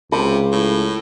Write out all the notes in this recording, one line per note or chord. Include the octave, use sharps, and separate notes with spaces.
C#2 C3 B5
A2